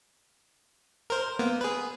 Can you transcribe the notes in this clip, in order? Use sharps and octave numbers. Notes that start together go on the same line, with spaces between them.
A#4 C5
A#3 B3
G#4 B4